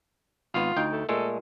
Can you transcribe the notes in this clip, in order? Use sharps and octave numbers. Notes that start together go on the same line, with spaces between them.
G#1 B3 F4
D2 D#4 G5
A3
A#2 G#3 A3 A4